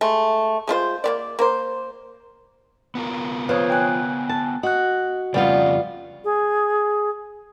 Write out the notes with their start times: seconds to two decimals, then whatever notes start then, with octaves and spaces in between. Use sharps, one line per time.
0.01 G#3 A3
0.67 G#3 A3 F4 C5
1.04 A#3 B3 D5
1.39 A#3 A#4 C5
2.95 B3 F4 A#4
3.49 F3 B4 C#5 D#6
3.70 G5 G#5 F#6
4.29 A5
4.63 F#4 D#5 F#6
5.34 F2 C#3 G3 B3 F4 D5
6.24 G#4